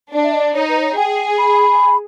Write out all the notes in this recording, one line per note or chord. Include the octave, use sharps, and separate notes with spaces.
D4 D5
E5
D#5
D#4 C#5
B4
C5
C#5
G#4 G5
B5